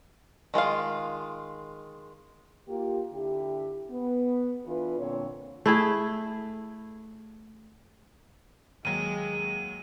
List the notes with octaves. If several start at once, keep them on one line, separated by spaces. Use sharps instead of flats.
D#3 G#3 F4 F5
A#3 F4 G4
D3 E4 G4
B3
E3 D4 F4 A4 B4
A#2 D3 C4 C#5
A3 E4 G#4
D#2 F#3 G#3 D#7